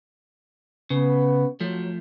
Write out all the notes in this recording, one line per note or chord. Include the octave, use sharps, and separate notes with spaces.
C#3 B3 B4
F3 F#3 A3